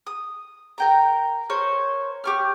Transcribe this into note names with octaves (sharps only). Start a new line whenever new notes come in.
D#6
A#4 G5 A#5
A#4 C5 C#5
G4 C#6 F6